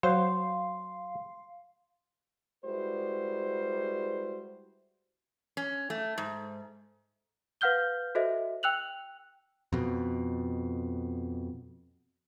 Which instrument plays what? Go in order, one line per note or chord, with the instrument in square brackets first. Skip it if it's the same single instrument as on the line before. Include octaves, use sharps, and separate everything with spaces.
[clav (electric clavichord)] F#3 [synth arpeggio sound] C5 [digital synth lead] F5 [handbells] C6
[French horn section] G3 G#3 E4 F#4 B4 C5
[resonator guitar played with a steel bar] C#4
A3
G#2
[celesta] B4 F5 F#5 F6 G6 G7
F#4 A4 C5 D#5 E5
G5 E6 F#6 F7 F#7
[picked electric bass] F2 B2